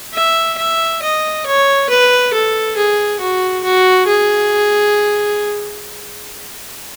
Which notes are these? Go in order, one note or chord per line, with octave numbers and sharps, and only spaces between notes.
E5
E5
D#5
C#5
B4
A4
G#4
F#4
F#4
G#4